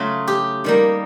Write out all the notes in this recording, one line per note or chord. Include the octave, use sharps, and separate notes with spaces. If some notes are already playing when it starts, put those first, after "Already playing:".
Already playing: C#3 F#3 A3 F4
G4
D#3 G3 A#3